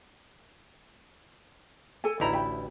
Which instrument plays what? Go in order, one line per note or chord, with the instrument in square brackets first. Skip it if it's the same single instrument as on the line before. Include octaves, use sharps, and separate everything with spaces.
[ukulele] A4 G#5
[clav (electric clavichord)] A1 D2 E4 [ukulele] D#4 A#5
[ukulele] G5 B5